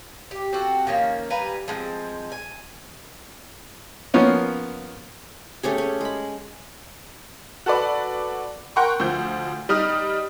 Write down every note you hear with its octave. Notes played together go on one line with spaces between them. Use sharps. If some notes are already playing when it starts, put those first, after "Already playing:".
G4
C4 F#4 A4
D#3 F3 A#3 C#4
G3 B4 G#5 A#5
F3 G#3 B3 C4
G#5
F3 A#3 B3 C#4
A3 C#4 G4 G#4
C#4
G#3 B5
F#4 A4 B4 D5
A#4 F#5 G5 C6 C#6
D2 F3 G6
G3 D#4 D#6 F6